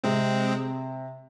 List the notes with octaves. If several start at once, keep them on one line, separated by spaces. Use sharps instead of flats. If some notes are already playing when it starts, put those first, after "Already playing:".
C3 G#3 C4